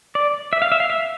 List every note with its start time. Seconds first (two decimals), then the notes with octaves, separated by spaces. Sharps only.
0.15 D5
0.53 E5
0.62 F5
0.72 E5
0.80 F5
0.90 E5